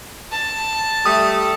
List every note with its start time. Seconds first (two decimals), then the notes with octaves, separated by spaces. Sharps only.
0.32 A5
1.05 G3 A3 D#6